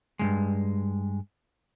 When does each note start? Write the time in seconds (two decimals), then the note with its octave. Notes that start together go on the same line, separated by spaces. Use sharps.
0.19 G2 C#3 G#3